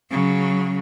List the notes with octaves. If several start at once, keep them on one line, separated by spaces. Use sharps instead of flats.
C#3 F#3